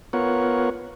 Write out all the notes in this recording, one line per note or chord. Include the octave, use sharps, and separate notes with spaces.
B3 F4 A#4 C#5 F#5